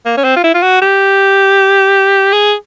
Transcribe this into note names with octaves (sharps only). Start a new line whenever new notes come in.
A#3
C#4
C4
F4
E4
F4
F#4
G4
G#4